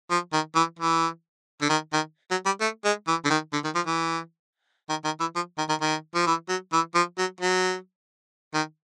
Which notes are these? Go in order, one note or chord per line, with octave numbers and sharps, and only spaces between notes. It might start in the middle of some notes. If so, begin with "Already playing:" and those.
F3
D#3
E3
E3
D3
D#3
D#3
F#3
G3
A3
G#3
E3
D3
D#3
D3
D#3
F3
E3
D#3
D#3
E3
F3
D#3
D#3
D#3
F3
E3
F#3
E3
F3
F#3
F#3
D#3